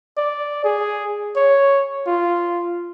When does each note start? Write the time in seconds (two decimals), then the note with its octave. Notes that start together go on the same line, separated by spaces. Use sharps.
0.17 D5
0.64 G#4
1.36 C#5
2.07 F4